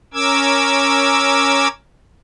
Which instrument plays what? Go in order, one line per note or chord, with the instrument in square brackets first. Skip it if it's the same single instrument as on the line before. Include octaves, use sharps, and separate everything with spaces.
[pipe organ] C#4 A#4 D6 E6 G#6